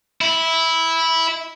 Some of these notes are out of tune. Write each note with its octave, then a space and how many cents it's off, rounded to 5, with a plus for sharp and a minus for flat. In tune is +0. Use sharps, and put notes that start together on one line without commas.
E4 -10